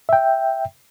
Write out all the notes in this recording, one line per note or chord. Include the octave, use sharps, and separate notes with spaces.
E5 G5